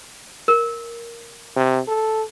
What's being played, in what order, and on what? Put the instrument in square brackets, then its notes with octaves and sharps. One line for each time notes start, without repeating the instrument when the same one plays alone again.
[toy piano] A#4
[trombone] C3
A4